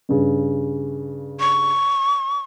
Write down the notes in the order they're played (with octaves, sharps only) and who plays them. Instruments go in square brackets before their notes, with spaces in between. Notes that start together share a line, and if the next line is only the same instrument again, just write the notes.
[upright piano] G2 C#3
[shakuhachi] C#6